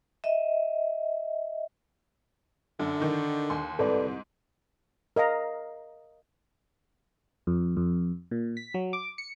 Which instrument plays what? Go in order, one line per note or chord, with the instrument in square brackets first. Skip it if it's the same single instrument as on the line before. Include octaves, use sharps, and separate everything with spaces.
[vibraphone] D#5 E5
[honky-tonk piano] F#2 [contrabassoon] D3
[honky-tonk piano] D#3 D#4
D#2 C6
[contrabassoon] C2 [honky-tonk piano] G#2 [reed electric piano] A4 B4 D5
[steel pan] A#4 D#5 F5 A#5
[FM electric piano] F2
F2
A#2
B6
F#3
D6
C#7